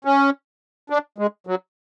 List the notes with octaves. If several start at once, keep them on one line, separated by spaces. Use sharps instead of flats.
C#4
D4
G#3
F#3